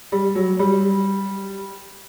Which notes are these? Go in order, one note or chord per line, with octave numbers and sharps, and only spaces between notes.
G3
F#3
G3